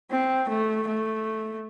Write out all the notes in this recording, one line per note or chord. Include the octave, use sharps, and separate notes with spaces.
C4
A3
A3